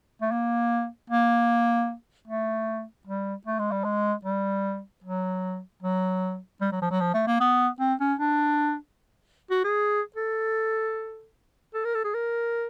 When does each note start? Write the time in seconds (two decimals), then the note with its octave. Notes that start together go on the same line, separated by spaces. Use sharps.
0.22 A3
0.31 A#3
1.10 A#3
2.28 A3
3.07 G3
3.47 A3
3.59 G#3
3.72 G3
3.84 G#3
4.25 G3
5.04 F#3
5.82 F#3
6.61 G3
6.72 F#3
6.82 F3
6.91 F#3
7.01 F3
7.14 A3
7.27 A#3
7.40 B3
7.80 C4
8.00 C#4
8.19 D4
9.51 F#4
9.64 G#4
10.16 A4
11.74 A4
11.85 A#4
11.95 A4
12.04 G#4
12.14 A#4